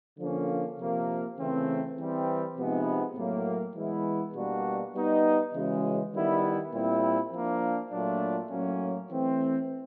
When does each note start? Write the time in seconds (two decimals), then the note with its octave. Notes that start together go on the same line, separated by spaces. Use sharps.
0.18 D3 F3 A#3 C#4
0.78 C3 F3 A#3
1.38 C#3 E3 A3 C4
1.97 E3 G3 C4
2.57 C3 F3 G#3 B3 D#4
3.16 A2 F#3 A#3
3.75 E3 G#3 B3 E4
4.35 B2 G3 A#3 D4 F#4
4.95 G3 B3 D#4
5.54 C#3 E3 G#3 C#4 F#4
6.13 D#3 G3 B3 E4
6.73 A#2 G3 C4 E4
7.32 F3 A#3 D4
7.92 A#2 F#3 A3 D4 F4
8.51 A2 F#3 A#3 C#4
9.10 E3 A3 C4